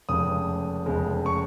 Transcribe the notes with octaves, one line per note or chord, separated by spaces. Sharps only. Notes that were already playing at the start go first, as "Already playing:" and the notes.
F1 F2 C#3 G#3 D#6
F1 F2 C#3 G#3
C#6